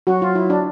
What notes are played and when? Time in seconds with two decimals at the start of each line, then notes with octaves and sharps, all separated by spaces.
0.07 F#3 F#4
0.22 F4
0.35 E4
0.50 D4